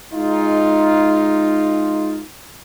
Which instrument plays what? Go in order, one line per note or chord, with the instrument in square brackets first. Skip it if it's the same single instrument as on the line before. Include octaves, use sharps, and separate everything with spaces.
[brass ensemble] G#3 D#4 F4